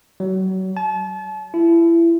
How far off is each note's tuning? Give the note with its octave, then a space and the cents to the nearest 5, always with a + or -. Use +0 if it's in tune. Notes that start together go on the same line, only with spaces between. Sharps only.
F#3 +30
A5 -35
E4 +25